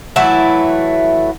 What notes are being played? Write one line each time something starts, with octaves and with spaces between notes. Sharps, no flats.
E3 F#3 A3 E4